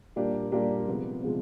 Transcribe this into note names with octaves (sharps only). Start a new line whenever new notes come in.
A#2 G3 A#3 D4 G4
A#2 G3 A#3 D4 G4
C3 F3 G#3 B3
C3 F3 G#3 B3